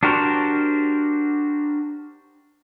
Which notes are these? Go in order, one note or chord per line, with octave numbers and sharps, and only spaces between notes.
D4 F#4 G4 A#4 C5